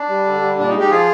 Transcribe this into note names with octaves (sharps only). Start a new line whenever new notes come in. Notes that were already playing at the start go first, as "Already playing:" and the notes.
Already playing: D4
G3
D3
G3
A#2 D4
D#4
G#3
D#4 G4
F3 F4 G#4